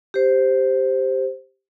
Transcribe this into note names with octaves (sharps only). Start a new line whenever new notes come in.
G4 C5